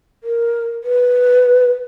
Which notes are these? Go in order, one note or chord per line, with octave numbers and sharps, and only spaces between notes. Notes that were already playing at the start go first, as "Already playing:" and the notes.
A#4
B4